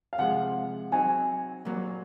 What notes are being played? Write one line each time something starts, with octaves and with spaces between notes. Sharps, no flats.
F5
C3 F3 G#3 F#5
F#3 C4 D#4 G#5
A#2 F#3 A#3